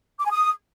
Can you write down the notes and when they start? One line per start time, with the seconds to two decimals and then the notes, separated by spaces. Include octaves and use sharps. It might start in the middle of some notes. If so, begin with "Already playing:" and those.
0.20 D6
0.25 G#5
0.31 D#6